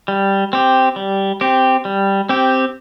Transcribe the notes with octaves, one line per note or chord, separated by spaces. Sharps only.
G3
C4 G4
G3
C4 G4
G3
C4 G4